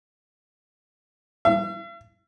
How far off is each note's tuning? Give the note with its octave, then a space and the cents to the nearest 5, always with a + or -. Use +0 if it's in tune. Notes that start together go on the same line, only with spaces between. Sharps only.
E5 +45